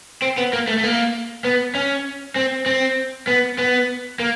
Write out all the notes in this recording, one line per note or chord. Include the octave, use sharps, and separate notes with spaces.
C4
B3
A#3
A3
A3
A#3
B3
C#4
C4
C4
B3
B3
A#3